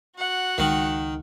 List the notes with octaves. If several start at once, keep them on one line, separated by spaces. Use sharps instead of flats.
F#4 F#5
C#2 D#3 G#3